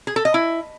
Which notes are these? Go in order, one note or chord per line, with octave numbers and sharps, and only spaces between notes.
G#4
A4
D#5
E4